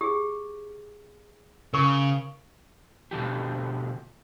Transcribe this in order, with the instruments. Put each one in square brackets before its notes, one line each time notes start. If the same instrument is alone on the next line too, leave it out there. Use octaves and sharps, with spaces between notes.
[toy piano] G4 G#4
[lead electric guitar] C#3 [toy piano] A#4 C#6
[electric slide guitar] B2 D3 F3 G4